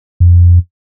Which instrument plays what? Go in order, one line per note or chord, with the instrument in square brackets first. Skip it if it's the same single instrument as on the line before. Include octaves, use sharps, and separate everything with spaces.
[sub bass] F2